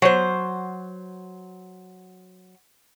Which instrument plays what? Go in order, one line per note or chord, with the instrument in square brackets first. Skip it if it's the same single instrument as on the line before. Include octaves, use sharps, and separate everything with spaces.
[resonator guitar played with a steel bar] F#3 C5